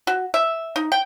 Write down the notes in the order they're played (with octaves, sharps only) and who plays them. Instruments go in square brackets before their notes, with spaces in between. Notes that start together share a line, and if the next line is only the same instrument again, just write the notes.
[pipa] F#4
E5
D#4
G5